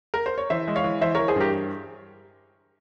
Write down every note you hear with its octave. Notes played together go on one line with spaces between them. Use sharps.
A#4
C5
C#5
E3 C5 E5
G#3
C#5 F5
E3
E3 C5 E5
E3 A#4 C#5
G#4 C5
G2 G4 A#4